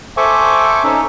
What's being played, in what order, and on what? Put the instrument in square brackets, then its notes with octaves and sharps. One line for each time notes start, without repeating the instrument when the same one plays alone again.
[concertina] A4 C5 E5 G#5 C#6 D6
C#4 D#4 A4